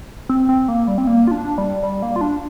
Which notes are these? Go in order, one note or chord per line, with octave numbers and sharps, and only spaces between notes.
C4
C4
A#3
G3
C4
A#3
F4
D4
G3
G3
A#3
F4
D4